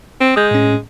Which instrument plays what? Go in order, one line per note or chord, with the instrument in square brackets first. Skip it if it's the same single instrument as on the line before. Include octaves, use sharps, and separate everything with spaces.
[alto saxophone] C4
[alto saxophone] G#3 [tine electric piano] D#6 G6
[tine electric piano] A2 C#4